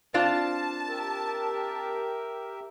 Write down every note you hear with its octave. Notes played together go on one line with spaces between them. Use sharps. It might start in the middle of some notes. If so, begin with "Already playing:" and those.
C4 D4 F4 A5
G4 A#4 E5